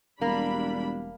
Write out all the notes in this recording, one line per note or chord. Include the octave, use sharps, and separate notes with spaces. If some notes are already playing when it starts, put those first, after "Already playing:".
E1 G3 A#3 D4 B5